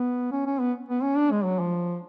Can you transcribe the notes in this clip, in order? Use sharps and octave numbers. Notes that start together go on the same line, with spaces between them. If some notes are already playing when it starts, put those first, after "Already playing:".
Already playing: B3
C#4
C#4
B3
B3
C#4
D4
G#3
F#3
F3